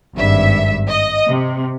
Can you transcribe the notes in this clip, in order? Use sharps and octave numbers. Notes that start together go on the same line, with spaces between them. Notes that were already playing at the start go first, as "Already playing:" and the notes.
G#1 G2 E5
D#5
C3